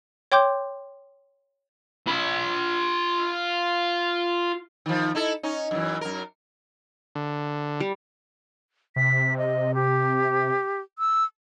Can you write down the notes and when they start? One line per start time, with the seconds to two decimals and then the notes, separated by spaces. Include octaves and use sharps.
0.32 C#5 G5 C6 D6 G6
2.07 F4 B5
4.86 D#3 F3
5.15 D#4 E4 A4
5.43 C#4 D#4
5.71 F#2 E3
6.01 F#2 A#4
7.15 D3
7.80 G3
8.96 C3 B6
9.37 D#5
9.75 G4
10.99 E6